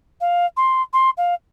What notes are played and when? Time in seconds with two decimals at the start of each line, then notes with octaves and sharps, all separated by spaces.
0.20 F5
0.57 C6
0.93 C6
1.17 F5